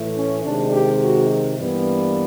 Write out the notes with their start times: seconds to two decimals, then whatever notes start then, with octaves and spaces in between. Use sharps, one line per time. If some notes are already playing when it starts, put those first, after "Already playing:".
Already playing: A2 E3 A3
0.15 C#4
0.44 C3 D#3 G#3 D4
0.73 G4
1.02 F#4
1.59 G2 E3 G3 A#3 B3